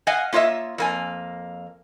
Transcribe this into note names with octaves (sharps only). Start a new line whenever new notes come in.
D#5 F5 F#5 G#5
A#3 F4 C#5 D#5 E5
F2 A#3 G#5